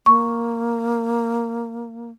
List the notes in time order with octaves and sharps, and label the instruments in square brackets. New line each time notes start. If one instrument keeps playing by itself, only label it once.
[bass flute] A#3 [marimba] C#6